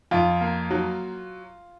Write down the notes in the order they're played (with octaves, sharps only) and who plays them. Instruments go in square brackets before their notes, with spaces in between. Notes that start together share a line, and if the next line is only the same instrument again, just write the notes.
[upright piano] F2 F4
A#3
F#3